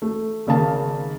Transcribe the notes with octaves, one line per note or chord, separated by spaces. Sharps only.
A3
G#1 C#3 A#3 A5